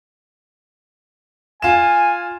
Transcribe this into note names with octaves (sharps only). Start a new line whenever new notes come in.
F4 G#5 E7